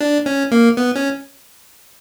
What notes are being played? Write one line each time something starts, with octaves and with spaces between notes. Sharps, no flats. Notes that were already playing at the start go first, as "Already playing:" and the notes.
D4
C#4
A#3
B3
C#4